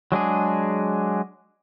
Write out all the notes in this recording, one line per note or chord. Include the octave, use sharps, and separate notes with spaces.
F#3 G#3 D4 G#4